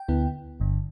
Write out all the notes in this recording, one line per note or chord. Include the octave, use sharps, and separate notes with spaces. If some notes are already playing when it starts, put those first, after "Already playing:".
Already playing: G5
D2 D3 B3 E4
G1 G2 D3